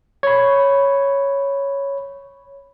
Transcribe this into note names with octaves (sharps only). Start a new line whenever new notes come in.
C#5 B5